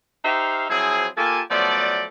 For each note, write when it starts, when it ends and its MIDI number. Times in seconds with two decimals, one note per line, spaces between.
0.25 0.65 63
0.25 0.65 67
0.25 0.65 72
0.25 0.65 76
0.25 0.65 77
0.70 1.06 53
0.70 1.06 54
0.70 1.06 60
0.70 1.06 64
0.70 1.06 68
1.17 1.41 58
1.17 1.41 65
1.17 1.41 67
1.17 1.41 69
1.17 1.41 80
1.17 1.41 81
1.50 2.05 53
1.50 2.05 54
1.50 2.05 57
1.50 2.05 59
1.50 2.05 74